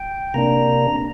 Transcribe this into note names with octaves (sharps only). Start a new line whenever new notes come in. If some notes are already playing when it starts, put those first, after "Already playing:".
Already playing: G5
C3 A#3 D4 A#5